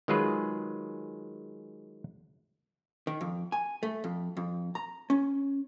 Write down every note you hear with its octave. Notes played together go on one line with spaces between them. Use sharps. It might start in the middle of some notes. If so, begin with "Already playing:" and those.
D#3 F#3 G#3 F4 G#4 B4
D#3
F2
G#5
A3
F2
F2
A#5
C#4